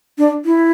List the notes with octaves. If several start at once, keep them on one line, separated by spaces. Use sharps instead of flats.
D4
E4